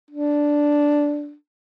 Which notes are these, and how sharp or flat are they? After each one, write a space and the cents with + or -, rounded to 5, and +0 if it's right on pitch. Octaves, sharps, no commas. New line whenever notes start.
D4 -5